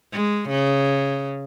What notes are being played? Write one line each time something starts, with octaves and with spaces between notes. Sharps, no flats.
G#3
C#3